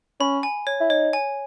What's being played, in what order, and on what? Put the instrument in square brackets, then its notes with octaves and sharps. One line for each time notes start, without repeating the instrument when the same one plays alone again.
[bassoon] C#4 [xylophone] B5
[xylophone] G#5
C#5
[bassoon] E4
[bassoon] D#4 [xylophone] C#5
[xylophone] G#5